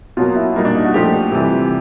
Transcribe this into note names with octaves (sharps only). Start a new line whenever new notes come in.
B2 F#3 A#3 F4
E4
A#2 G3 A#3 D#4
D4
D#4
F#4
A#2 F3 A3 G4
C3 E3 G3